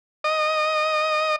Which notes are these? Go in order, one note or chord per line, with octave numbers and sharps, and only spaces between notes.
D#5